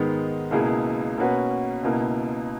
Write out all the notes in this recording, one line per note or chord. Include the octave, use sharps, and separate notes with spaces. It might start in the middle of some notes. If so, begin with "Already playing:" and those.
Already playing: G#2 D#3 G#3 B3
C#2 B2 A#3 E4 G#4
B2 A#3 C#4 F#4 B4
C#2 B2 A#3 E4